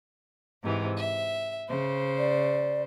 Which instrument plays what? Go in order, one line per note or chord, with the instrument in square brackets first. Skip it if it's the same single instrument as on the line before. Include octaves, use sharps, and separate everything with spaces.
[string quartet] G#2 C3 E3
E5
C#3 C5
[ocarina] D5